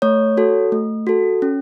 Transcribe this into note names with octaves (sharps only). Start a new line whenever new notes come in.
A3 C#5
F#4 A4
A3
F#4 A4
C#4